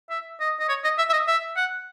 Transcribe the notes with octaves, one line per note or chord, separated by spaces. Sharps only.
E5
D#5
D#5
C#5
D#5
E5
E5
D#5
E5
F#5